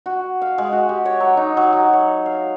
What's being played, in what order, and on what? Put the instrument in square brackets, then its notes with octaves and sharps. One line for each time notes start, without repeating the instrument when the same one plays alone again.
[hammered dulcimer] F#4
F5
G#3
F#4
G4
C#5
F#3
D#4
F#3
F#3
C#5
F5